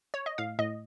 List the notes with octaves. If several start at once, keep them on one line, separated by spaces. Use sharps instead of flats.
C#5
D#5
A2 F5
A2 D#5